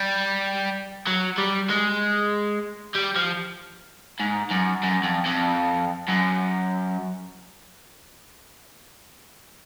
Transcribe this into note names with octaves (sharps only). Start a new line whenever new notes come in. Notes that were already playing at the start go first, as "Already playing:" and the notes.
Already playing: G3
F#3
G3
G#3
G3
F3
G#2
F#2
F#2
F2
F2
F#2